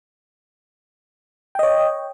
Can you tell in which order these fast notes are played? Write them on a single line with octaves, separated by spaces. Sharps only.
G5 D#5 C#5